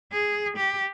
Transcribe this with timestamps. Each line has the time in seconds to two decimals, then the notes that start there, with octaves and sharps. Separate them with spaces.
0.12 G#4
0.57 G4